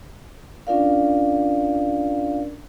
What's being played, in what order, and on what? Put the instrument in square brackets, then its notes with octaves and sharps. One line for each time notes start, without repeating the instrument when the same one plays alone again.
[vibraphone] C#4 D4 F4 A#4 D5 F5